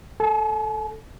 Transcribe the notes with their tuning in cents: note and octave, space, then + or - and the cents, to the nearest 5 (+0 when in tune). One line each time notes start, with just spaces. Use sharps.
A4 +0 G#5 +45